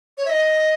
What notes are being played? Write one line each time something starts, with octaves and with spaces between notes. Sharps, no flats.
C#5
E5
D#5